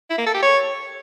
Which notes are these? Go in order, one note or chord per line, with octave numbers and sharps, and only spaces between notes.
E4
A#3
A4
G4
C#5